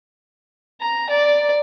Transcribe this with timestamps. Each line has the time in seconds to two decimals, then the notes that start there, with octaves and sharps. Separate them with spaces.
0.81 A#5
1.10 D5